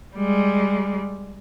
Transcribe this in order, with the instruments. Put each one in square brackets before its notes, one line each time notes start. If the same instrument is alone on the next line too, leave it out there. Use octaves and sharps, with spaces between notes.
[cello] G3 G#3